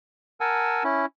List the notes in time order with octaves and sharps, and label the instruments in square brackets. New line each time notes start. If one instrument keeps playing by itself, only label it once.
[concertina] A#4 F#5 G#5 A5 E6
C#4 E4